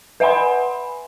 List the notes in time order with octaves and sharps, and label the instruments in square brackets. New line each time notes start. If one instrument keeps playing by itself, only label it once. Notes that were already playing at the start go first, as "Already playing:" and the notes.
[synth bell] B4 E5 F#5 G#5 B5 C6